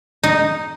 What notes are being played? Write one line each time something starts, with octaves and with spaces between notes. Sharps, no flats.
D#4